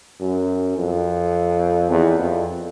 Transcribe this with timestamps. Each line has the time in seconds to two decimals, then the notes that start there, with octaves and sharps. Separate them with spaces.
0.20 F#2
0.77 F2
1.91 E2
2.19 F2